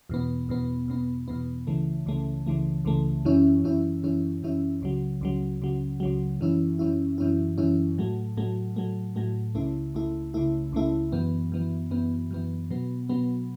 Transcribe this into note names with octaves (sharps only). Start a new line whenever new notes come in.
E2 B2 B3
E2 B2 B3
E2 B2 B3
E2 B2 B3
C#2 C#3 E3 A3
C#2 C#3 E3 A3
C#2 C#3 E3 A3
C#2 C#3 E3 A3
F#2 E3 C#4 E4
F#2 E3 C#4 E4
F#2 E3 C#4 E4
F#2 E3 C#4 E4
C#2 C#3 F#3
C#2 C#3 F#3
C#2 C#3 F#3
C#2 C#3 F#3
F#2 E3 C#4 E4
F#2 E3 C#4 E4
F#2 E3 C#4 E4
F#2 E3 C#4 E4
A2 F#3 A3
A2 F#3 A3
A2 F#3 A3
A2 F#3 A3
C#2 C#3 A3 E4
C#2 C#3 A3 E4
C#2 C#3 A3 E4
C#2 C#3 A3 E4
F#2 E3 B3
F#2 E3 B3
F#2 E3 B3
F#2 E3 B3
B2 F#3 B3
B2 F#3 B3